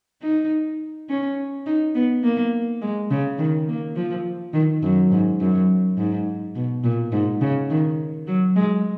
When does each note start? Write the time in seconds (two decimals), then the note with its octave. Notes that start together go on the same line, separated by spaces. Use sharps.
0.22 D#4
1.10 C#4
1.66 D#4
1.95 B3
2.24 A#3
2.82 G#3
3.10 C#3
3.38 D#3
3.68 A#3
3.96 F3
4.53 D#3
4.82 F#2
5.11 G#2
5.40 F#2
5.98 G#2
6.56 B2
6.84 A#2
7.12 G#2
7.41 C#3
7.71 D#3
8.27 F#3
8.56 G#3